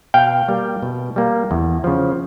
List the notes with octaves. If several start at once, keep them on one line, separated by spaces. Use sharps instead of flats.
B2 F5 G5
G3 A#3
B2
G3 A#3
E2
C#3 F3